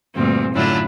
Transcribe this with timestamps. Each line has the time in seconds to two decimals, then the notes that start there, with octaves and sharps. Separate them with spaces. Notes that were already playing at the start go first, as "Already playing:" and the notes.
0.14 D2 G2 A#2 C4
0.53 F#2 A2 D3 D4 E4 F4